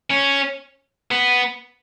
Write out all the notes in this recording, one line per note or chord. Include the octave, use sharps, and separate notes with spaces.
C#4
B3